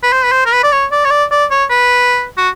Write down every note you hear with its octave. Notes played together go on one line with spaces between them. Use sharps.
B4
C5
B4
C5
A#4
B4
D5
C#5
D5
C#5
D5
D5
C#5
B4
F#4